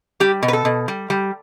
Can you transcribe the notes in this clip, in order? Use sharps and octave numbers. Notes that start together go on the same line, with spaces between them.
G3 G4
B2
B4
A4
B2
G3
G3